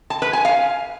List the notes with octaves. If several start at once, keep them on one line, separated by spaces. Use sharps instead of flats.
A5
B4
G#5
F5